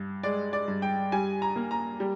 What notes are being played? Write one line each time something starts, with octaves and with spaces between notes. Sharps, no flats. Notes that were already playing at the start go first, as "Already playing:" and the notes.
Already playing: G2
G#3 D5
D5
G2
G5
G3 G#5
A#5
A#3
A#5
G3